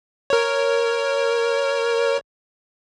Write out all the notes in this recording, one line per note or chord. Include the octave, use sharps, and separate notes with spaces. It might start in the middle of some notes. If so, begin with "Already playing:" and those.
A#4 C#5